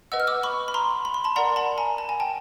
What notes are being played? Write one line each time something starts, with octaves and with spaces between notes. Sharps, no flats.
B4 D#5 F#5 E6
F6
D6 E6
B5 C#6
B5
A#5 C6
B5
C6
A5 B5
A#4 D5 F#5 A#5 C6
A5 B5
G#5 A#5
A5
G#5
G5 A5